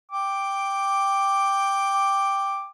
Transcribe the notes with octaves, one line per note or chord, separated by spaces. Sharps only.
G5 D6